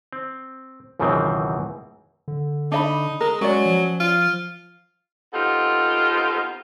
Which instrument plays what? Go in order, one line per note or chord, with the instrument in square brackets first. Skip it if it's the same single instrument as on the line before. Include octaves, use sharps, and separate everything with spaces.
[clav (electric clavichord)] C4
C#2 F#2 B2 D#3 E3 C4
[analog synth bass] D3
[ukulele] D4 D#5 B5 [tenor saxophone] D#4
[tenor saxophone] G#3 [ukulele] A#4
[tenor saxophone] F#3 [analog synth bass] G#3 [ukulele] C#4 D5
[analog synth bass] F3
[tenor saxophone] F4
[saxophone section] B3 C4 D#4 F4 G4 A4